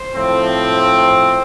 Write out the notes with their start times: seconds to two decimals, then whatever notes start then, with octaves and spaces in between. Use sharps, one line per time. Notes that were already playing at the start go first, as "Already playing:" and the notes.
Already playing: C5
0.16 A2 F3 C4
0.73 C5